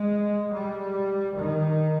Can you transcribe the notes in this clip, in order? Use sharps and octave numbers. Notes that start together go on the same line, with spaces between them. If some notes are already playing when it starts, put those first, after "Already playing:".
Already playing: G#3
G3
D#3